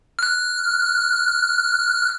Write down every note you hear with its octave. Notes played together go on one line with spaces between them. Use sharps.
F6 F#6